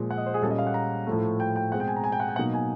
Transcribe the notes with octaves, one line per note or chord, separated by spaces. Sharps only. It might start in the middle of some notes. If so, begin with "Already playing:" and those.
Already playing: A#2 F3 G#3
F#5
D#5
C5
G#4
A#2 G3 A#3 C#4 A4
D#5
F5
F#5
A#5
A2 F3 A3
G5
G5
B2 G#3 C4 F#5
G5
G#5
A#5
G#5
G5
F#5
G5
B2 F#3 A#3 D#4 F#5
G#5